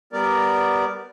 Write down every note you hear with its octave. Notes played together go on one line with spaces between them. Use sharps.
G3 B3 A#4 D5